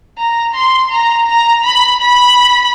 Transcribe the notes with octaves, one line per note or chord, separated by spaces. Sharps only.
A#5
C6
A#5
A#5
B5
B5